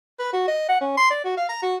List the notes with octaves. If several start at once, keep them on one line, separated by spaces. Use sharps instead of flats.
B4
F#4
D#5
F#5
C#4
C6
D5
F#4
F5
A#5
F#4